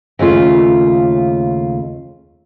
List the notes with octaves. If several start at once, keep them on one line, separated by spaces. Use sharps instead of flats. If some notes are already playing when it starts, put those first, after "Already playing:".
D#2 C#3 A3 F4